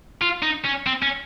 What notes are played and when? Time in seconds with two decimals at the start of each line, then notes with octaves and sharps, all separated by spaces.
0.21 F4
0.42 D#4
0.64 C#4
0.86 C4
1.02 C#4